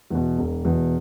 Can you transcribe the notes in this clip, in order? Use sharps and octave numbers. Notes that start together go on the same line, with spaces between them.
E2 B2
E1
E2 B2